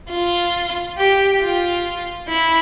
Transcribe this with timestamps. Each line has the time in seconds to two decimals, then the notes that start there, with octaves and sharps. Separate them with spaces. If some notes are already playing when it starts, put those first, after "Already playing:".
0.10 F4
0.98 G4
1.41 F4
2.28 E4